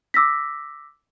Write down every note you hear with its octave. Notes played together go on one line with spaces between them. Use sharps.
D6 E6 A#6 B6